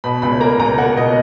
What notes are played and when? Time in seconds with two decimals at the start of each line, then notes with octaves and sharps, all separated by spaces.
0.04 B2 B5
0.22 C#2 B5
0.40 A#3 A#5
0.59 C#2 A#5
0.78 A#3 F#5
0.97 B2 D#5